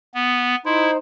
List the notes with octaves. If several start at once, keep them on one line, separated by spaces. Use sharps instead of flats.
B3
D#4 E4 C5